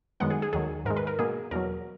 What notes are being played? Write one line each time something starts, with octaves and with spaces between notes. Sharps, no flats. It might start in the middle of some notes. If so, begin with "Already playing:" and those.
F#2 D#3 G#3 B3 F#5
G#4
G#4
D#2 D#3 F#3 G#4
G#2 D#3 G#3 A#4
B4
A#4
B2 A#3 G#4
E2 B2 F#3 A#4